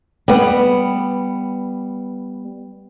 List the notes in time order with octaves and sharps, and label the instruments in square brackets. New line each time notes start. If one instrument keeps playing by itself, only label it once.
[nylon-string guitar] G3 B3